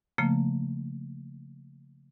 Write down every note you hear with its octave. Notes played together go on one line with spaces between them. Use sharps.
C#3 F3 A3 A#3